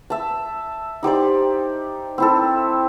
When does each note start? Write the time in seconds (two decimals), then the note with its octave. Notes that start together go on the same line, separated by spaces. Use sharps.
0.10 E5 A5
1.03 D#4 G4 C5 D5
2.18 C4 E4 A4